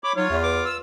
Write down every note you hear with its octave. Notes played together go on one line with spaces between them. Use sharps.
C#5 B5 D6
F#3 D#4 F4 C#5
E2 E5
B4 D6
E6